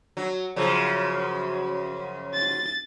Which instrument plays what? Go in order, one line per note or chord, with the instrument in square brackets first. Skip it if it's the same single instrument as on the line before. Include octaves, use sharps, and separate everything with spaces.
[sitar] F#3
F#2 C#3 F3
[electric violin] A6